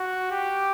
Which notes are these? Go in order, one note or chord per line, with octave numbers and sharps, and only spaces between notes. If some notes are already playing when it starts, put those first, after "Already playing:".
Already playing: F#4
G4